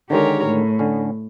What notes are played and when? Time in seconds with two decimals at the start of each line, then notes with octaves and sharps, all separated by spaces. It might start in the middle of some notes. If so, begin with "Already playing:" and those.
0.10 D3 D#3 G#3 G4 A#4 C#5
0.46 A2
0.79 D3 C#4